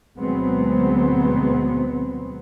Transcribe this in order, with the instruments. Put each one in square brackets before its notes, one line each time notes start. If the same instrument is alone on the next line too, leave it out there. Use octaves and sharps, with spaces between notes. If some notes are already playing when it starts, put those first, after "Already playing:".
[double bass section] D2 B2 F#3 G#3 B3 C4